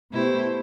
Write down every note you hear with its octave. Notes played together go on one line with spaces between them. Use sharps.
B2 A3 E4 G4 C5